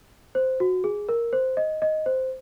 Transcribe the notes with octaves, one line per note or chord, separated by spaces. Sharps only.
C5
F#4
G#4
A#4
C5
D#5
D#5
C5